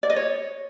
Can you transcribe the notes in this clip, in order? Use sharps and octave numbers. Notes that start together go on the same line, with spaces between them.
D5
D#5
C#5